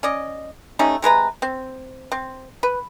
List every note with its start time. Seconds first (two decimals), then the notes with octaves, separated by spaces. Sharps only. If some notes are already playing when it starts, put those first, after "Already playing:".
0.03 C#4 D5 D#5
0.79 G3 A3 C#4 D#4
1.02 C3 G#3 B4 A#5
1.42 C4
2.12 C4
2.63 B4